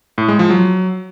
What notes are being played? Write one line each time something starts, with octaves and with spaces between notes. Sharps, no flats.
A2
G#3
F3
F#3